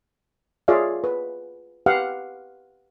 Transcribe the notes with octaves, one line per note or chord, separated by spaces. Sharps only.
F4 G#4 C#5 D5 E5 F5
B4
G4 B4 F5 F#5